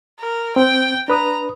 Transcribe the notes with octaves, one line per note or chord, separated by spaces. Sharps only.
A#4
C4 G5
D4 B4 A#5 D#6